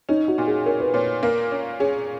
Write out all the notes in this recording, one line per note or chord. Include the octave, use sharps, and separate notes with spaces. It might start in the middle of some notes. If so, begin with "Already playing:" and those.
C#4 D#4
F#4
A#2
G#4
C#4 A#4
B4
A#2 C#5
A#3 A#4
C#4
C#4 G#4